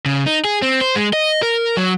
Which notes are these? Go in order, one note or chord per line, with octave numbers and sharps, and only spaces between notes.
C#3
D#4
G#4
C4
C5
G#3
D#5
A#4
F#3